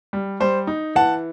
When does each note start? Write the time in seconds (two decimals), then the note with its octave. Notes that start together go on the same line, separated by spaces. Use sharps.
0.13 G3
0.40 G3 C5
0.67 D#4
0.95 E3 F#5 A5